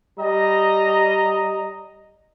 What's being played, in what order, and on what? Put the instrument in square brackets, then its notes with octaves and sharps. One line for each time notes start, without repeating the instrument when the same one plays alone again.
[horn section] G3 D#5 A#5